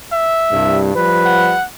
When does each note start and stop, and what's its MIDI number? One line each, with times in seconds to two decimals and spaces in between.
0.12 0.81 76
0.52 0.93 36
0.52 0.93 43
0.96 1.56 53
0.96 1.56 55
0.96 1.56 71
1.25 1.65 78